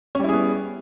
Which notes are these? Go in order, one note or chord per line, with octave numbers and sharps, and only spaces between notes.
G3 B3 C#4 E4 G#4